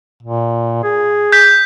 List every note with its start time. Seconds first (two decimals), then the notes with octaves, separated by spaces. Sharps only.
0.22 A#2
0.84 G#4
1.32 G6 B6